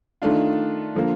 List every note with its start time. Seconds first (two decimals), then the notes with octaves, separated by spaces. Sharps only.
0.22 D#3 A3 D4 F4
0.95 D3 F3 A#3